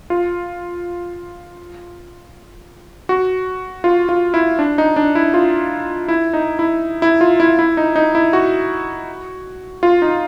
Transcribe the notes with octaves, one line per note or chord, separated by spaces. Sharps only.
F4
F#4
F4
F4
E4
D4
D#4
D4
E4
F4
E4
D#4
E4
E4
F4
E4
E4
D#4
D#4
E4
F#4
F4
D#4